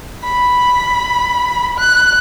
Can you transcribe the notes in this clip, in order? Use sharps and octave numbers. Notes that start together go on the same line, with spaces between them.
B5
F#6